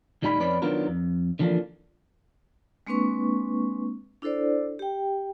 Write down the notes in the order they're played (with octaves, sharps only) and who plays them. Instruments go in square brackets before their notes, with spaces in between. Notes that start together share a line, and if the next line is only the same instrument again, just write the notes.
[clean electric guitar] D2 A2 G3 D#4 G#5 B5
F2 C#4 B4 D5 B5
D#3 F#3 B3 D4 F4 A#4
F2
D3 E3 F3 A#3 D4
[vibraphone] G#3 A#3 C4 D4 B4 C#6
D4 E4 A4 C5 D5
G4 G5